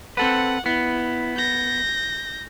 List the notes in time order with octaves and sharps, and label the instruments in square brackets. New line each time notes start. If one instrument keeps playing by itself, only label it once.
[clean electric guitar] C4 A4 B4 [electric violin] F#5
[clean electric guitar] B3 [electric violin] E4
[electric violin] G6 A#6